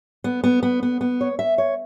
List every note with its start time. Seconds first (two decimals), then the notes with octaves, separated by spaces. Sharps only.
0.24 B3
0.44 B3
0.63 B3
0.83 B3
1.01 B3
1.21 C#5
1.39 E5
1.58 C#5